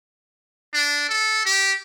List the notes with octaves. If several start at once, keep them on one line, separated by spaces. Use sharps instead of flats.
D4
A4
G4